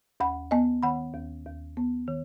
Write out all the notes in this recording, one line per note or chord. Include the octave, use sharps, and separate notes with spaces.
D#2 F#5 B5
B3 D#5 G#5
D#3 F#5 B5
D#2
D#2
B3
D#3